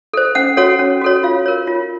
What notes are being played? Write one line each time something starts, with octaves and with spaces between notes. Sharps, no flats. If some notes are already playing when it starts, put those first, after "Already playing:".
A4 C5
C#4 F#5
F#4 A4 C#5 F#5
C#4
F#4 A4 C#5
F4 F5
A#4 C#5
F4